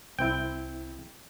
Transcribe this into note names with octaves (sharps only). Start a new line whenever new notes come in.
C2 C4 E4 G5